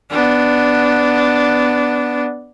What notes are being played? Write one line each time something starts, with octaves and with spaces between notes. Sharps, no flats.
B3 D4